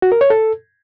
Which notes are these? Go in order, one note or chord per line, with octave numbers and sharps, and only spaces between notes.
F#4
A#4
C#5
A4